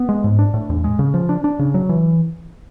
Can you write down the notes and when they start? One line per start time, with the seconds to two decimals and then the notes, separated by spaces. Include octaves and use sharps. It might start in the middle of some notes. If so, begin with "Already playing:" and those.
Already playing: B3
0.09 G#3
0.24 G#2
0.39 D4
0.54 A2
0.70 E2
0.84 G#3
0.99 C#3
1.14 F3
1.29 D4
1.44 D4
1.59 C#3
1.74 F#3
1.89 E3